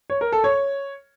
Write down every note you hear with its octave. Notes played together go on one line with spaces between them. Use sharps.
C#5
A#4
A4
C#5